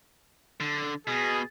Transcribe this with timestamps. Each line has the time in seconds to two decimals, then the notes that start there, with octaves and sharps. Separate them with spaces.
0.60 D3
1.07 B2 G#4